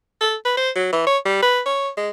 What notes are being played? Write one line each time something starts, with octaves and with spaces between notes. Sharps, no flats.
A4
B4
C5
F#3
E3
C#5
G3
B4
C#5
G#3